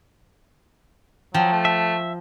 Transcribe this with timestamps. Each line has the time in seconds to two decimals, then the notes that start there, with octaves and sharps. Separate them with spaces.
1.34 F3 F#3 G5
1.52 A3
1.65 E5